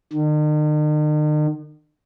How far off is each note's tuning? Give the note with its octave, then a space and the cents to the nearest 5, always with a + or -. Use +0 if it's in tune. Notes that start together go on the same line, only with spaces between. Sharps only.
D#3 -45